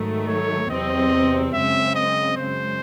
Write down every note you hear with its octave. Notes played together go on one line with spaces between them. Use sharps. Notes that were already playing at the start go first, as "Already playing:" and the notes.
Already playing: G#2 D#3 F#3 A3
C#5
E2 C3 F#3 C4 D#5
F#2 C#3 G#3 C4 E5
D#5
F#2 C#3 G#3 C5